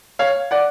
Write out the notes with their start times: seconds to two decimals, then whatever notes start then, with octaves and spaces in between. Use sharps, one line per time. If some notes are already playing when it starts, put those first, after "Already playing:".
0.19 C#5 F5
0.51 D5 F#5